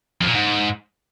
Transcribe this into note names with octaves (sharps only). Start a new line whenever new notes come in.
F2
A#2
G#2